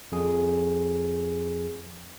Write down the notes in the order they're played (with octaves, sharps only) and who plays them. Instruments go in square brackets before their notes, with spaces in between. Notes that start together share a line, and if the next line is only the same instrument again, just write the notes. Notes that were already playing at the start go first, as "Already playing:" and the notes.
[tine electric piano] F2 G#4